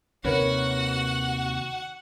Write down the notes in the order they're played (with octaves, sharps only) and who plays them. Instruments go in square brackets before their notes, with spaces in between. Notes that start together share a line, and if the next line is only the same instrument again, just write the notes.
[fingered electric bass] D#2 C3 D#3 [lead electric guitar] F#4 [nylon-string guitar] A#4 B4 C#5 [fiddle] F#5